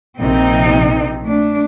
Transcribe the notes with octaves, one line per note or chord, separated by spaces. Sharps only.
A#1 C3 C4 D#4
A3 D4